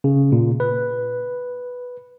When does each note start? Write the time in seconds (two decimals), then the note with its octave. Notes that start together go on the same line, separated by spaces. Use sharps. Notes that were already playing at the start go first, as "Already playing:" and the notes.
0.04 C#3
0.32 A#2
0.60 B4